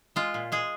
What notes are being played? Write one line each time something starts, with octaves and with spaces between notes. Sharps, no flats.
G#3 F4
A#2
G#3 G#4